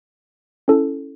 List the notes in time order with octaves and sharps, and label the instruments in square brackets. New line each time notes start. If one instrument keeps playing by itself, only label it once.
[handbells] C#4 E4 A4